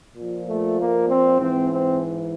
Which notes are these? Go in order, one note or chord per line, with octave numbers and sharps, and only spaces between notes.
A#2 F3
A3
A#3
C4
G#2 E3 C4
C4